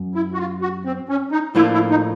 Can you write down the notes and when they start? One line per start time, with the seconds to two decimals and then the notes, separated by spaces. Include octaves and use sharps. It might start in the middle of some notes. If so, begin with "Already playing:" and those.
Already playing: F#2
0.15 E4
0.34 F#4
0.38 F4
0.61 F#4
0.85 C4
1.09 C#4
1.31 D#4
1.55 A2 F3 A#3 D4 E4 F4
1.73 E4
1.90 D#4